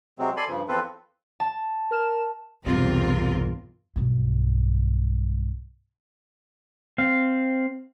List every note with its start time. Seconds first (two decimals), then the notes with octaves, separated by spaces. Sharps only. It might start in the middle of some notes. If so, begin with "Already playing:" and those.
0.19 C3 F#3 G#3 C4
0.37 A4 D5 G#5 B5 C6
0.48 G2 C#3 F3
0.68 E2 F3 C4 F4 A4 B4
1.40 A5
1.91 A#4 F6 E7
2.66 B1 E2 G2 C3 C4 F4 A#4
3.96 B1 G2
6.98 C4 F5